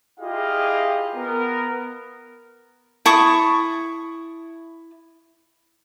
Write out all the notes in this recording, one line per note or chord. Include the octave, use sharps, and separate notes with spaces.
E4 F4 G4 G#4 D#5 F5
B3 A#4
E4 A5 C#6 D#6